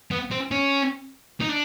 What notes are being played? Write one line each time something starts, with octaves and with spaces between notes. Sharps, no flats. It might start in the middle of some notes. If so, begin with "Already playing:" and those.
B3
C4
C#4
D#4
D4